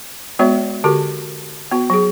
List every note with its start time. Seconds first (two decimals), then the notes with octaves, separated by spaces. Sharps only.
0.39 G#3 B3 F#4 C#5 E5
0.84 D3 F#4 G4 A#4
1.71 B3 F#4
1.90 F#3 G#4